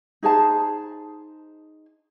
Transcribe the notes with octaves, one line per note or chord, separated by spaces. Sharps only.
D#4 G#4 C5 A5